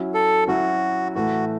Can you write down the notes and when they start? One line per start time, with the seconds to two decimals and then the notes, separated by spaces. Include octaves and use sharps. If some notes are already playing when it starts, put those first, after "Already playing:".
Already playing: F#3 C#4 E4
0.14 A4
0.47 F#3 C#4 E4 F#4
1.15 A2 E3 A3 F#4